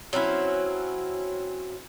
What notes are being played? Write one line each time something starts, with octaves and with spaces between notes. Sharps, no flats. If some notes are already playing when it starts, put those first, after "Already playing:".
F#3 C4 C#4 E4